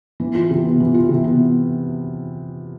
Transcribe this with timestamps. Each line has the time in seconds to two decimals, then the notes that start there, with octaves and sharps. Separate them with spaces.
0.20 E3
0.35 F4
0.51 C3
0.65 B3
0.80 E3
0.94 F4
1.09 C3
1.24 B3